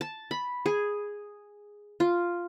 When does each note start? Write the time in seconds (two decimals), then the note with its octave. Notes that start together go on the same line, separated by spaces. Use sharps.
0.01 A5
0.31 B5
0.66 G#4
2.00 F4